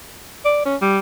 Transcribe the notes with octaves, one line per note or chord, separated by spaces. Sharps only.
D5
C#4
G3